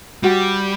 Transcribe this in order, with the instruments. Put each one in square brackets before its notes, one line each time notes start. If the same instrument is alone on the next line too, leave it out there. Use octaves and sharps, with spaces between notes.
[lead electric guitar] G3 [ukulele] F#4